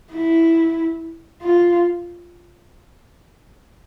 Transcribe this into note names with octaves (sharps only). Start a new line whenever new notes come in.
E4
F4